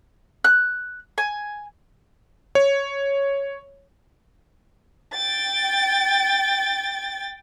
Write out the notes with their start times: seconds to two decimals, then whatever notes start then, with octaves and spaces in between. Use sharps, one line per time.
0.44 F#6
1.18 G#5
2.55 C#5
5.13 G5 A6